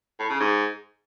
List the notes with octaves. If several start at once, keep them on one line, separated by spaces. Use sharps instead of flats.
A2
C#3
G#2